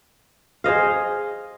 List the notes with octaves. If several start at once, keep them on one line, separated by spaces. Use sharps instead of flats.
G#4 C5 D#5 F5